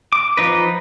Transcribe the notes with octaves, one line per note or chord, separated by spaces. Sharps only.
D6
F3 D#4 B4